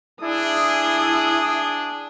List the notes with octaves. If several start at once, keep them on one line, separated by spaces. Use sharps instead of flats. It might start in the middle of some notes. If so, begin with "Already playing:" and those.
D4 E4 G#4 D#6